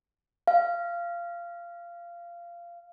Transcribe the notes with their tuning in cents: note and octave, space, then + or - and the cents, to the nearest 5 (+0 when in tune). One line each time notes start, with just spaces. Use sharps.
F5 -20